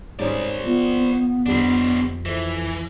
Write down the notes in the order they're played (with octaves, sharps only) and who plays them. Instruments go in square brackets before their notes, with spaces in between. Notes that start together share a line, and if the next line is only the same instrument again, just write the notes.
[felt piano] G#2 G3 C#4 [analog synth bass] C4 [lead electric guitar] C5 D5
[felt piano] F3 [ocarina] B3
[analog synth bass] F2 [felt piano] D3 G3 B6 [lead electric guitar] C4 D4
[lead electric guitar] E3 [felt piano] A4 C5